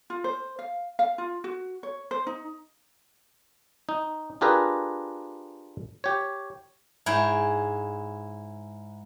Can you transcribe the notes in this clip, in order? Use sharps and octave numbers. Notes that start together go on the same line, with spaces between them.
F4
C5
F5
F5
F4
F#4
C#5
C5
D#4
D#4
D4 F4 G4 G#4 A#4 B4
G4 C#5
G#2 E4 C#5 G5